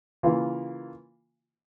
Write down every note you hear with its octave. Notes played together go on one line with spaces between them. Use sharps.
C#3 E3 A#3 F4